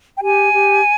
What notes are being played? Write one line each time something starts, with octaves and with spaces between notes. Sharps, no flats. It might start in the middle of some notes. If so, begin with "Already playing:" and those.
G5
G4 G#5
G4